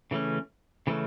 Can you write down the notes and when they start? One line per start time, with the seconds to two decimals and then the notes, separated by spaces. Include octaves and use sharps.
0.11 C#3 E3 A3 C#4
0.87 C#3 E3 A3 C#4